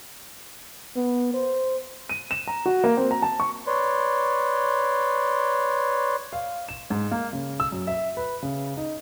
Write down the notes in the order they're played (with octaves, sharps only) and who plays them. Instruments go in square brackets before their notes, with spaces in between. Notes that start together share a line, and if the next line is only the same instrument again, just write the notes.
[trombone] B3
C5
[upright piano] D#7
E7
A#5
F#4
A#3
C4
A#5
A5
C#6
[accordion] B4 C#5 D5 C6
[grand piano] F5
E7
G#2
A#3
C#3
E6
F#2
E5
B4
C#3
D#4